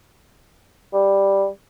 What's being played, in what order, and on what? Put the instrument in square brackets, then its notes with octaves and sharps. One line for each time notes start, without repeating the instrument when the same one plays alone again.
[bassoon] G3